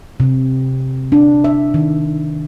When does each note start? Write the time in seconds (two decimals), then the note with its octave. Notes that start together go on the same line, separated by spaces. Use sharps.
0.20 C3
1.12 D4
1.44 E5
1.74 D#3